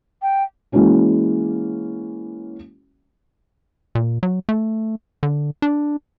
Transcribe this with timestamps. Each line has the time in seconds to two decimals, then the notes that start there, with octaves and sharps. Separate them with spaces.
0.22 G5
0.72 E3 G#3 A#3 C#4 F#4
3.95 A#2
4.23 F#3
4.49 A3
5.23 D3
5.62 D4